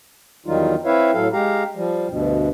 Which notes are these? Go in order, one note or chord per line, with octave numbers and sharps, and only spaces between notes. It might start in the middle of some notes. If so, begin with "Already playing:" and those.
E2 D#3 F#3 G3 D#4 F4
C4 E4 B4 C#5 E5 F5
A2 F#3 A4 F5
G#3 G4 F5 A#5
F3 G3
D2 G2 B2